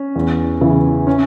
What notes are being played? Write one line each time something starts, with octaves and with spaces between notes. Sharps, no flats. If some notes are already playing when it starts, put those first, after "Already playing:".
Already playing: C#4
E2
C#3 E3
C#4